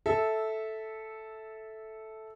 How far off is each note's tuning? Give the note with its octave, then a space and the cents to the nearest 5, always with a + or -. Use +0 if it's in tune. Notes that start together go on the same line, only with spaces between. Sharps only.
A4 -5 E5 -10